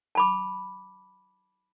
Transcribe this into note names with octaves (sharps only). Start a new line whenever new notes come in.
A5 B5 D6